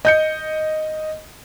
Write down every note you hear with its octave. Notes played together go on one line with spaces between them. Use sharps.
D#5 G6 C#7